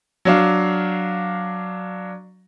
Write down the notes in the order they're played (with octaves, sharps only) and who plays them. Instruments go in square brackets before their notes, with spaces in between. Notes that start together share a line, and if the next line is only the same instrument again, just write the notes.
[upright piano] F#3 D4 F5